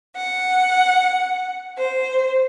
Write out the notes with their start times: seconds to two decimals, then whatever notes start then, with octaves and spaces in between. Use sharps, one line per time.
0.18 F#5
1.77 C5